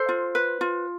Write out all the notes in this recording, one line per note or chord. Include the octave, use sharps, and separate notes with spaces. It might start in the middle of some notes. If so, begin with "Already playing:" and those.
Already playing: A4 C5
F4
B4
F4